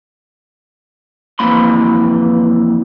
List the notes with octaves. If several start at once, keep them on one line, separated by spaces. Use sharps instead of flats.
F2 E3 A#3 B5 C6